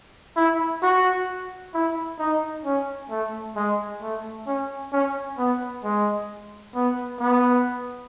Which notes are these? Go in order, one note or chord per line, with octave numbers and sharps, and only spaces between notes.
E4
F#4
E4
D#4
C#4
A3
G#3
A3
C#4
C#4
B3
G#3
B3
B3